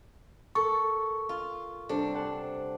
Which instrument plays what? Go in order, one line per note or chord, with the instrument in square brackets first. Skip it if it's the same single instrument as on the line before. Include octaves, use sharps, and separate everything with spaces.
[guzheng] A4 [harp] A#4 [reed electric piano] C#6
[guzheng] F4
[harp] G2 C3 A4 [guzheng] D4
[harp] C5 F#5 A5